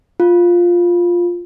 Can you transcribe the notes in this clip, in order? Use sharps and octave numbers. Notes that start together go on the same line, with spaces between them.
F4